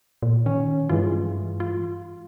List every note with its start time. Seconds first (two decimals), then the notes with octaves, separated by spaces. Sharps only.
0.23 A#2
0.46 D#3 C#4
0.89 G2 E3 G#3 F4
1.60 F4